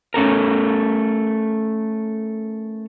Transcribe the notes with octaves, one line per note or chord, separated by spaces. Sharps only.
A3 C#4 A4 A#4